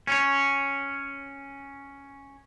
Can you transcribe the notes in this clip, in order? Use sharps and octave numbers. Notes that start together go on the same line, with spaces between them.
C#4 C#5